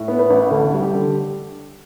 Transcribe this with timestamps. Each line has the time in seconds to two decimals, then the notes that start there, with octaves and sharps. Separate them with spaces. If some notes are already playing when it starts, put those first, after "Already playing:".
Already playing: A2
0.08 B3
0.19 B4
0.30 A1
0.51 D2 A4
0.73 G3
0.82 G4
0.94 D3